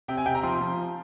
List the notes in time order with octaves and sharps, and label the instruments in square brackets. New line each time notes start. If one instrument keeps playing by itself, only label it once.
[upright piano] C3 G5
G#5
C3 G5
A#5
F3 C6
F3